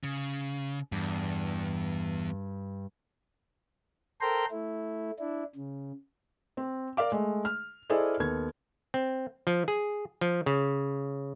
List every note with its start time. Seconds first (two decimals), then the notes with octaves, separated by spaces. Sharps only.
0.04 C#3
0.92 E2 G2
4.21 A4 A#4 C5 G5 A#5 C6
4.51 A3 E4
5.19 D4 E4
5.56 C#3
6.57 C4
6.97 A#4 D5 F5 D6
7.12 G#3 A3
7.45 F6
7.90 E4 G#4 A4 C5 D5 D#5
8.20 D#2 B3 A4 G#6
8.94 C4
9.47 F3
9.68 G#4
10.21 F3
10.46 C#3